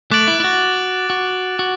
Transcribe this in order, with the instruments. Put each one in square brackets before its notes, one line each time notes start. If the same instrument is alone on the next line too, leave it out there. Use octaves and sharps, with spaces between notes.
[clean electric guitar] A3 [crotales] D6 F#6 A6 D7 F#7
[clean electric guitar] E4
E4
F#4
F#4
F#4